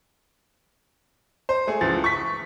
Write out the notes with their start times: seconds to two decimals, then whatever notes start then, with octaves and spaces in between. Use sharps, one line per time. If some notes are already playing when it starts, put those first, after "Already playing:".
1.49 C5
1.67 A3 G#4
1.81 C#2 E3 F3 A6
2.04 C#6 B6